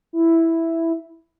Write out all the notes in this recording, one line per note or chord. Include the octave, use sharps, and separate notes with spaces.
E4